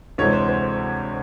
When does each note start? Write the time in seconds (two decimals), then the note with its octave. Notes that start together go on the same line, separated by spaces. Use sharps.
0.18 D2 C3 E3 G#3 C4 C#5
0.33 C5
0.49 C5